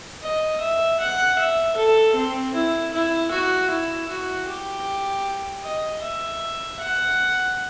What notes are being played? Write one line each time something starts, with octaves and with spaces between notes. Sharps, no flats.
D#5
E5
F#5
E5
A4
C4
E4
E4
F#4
E4
F#4
G4
D#5
E5
F#5